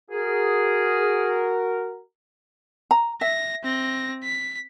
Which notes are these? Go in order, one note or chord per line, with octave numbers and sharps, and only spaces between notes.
F#4 G#4 A#4
A#5
E5 A#6
C4 A#6
B6